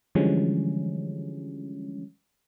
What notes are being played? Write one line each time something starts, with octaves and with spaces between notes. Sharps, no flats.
D3 E3 F3 G3 G#3 C#4